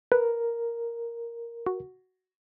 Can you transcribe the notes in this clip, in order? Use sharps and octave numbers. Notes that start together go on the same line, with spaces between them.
A#4 B4
F#4